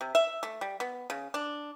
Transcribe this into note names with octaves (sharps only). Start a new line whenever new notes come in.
C3
E5
A3
G3
B3
C#3
D4